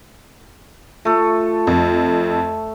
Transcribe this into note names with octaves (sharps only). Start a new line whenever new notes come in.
A3 F4 A4
F2